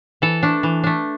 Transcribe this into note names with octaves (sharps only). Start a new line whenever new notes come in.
E3 A4
A3 D4
E3
A3 D4